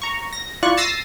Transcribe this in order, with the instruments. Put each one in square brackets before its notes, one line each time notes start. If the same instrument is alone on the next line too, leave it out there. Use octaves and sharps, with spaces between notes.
[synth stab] A#5 C#6
A#6
E4 F4 D5 C#6 F#6
E6 A6 A#6 C7 D#7